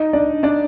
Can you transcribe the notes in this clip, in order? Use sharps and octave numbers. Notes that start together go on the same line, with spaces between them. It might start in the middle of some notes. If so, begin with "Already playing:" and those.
Already playing: D#4 D#5
D4 D5
D4 D5